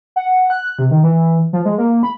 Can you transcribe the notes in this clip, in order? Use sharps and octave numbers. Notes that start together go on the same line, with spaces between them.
F#5
F#6
C3
D#3
E3
F3
G#3
A#3
B5